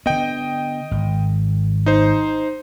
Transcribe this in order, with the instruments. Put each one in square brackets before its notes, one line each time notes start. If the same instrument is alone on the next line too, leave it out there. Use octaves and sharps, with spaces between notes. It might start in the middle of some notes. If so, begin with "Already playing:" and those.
[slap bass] D3 B3 [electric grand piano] D#5 G5
[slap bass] G#1
[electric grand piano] D#4 C5